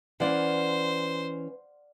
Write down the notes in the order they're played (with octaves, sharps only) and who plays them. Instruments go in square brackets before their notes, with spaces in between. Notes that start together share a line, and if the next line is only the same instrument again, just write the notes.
[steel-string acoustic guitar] E3 C#4 [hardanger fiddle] C5 [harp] D5 F5 F#5